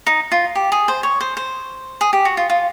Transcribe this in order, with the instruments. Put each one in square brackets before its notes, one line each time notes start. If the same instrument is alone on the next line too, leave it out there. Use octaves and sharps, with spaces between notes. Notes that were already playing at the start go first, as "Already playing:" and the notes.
[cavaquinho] D#4
F4
G4
G#4
C5
C#5
C5
C5
G#4
G4
F#4
F4
F4